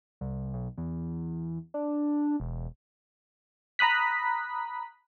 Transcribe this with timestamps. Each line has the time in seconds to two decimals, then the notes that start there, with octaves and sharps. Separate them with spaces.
0.21 C2
0.54 B1
0.78 E2
1.74 D4
2.40 E1
3.79 A#5 B5 D#6 F#6 B6